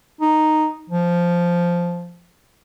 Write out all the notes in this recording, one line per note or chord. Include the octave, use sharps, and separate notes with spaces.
D#4
F3